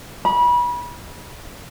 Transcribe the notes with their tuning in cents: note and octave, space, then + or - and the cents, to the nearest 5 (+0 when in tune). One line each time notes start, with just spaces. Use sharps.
B5 -30